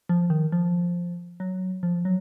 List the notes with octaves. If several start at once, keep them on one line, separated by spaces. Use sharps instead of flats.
F3
D#3
F3
F#3
F3
F#3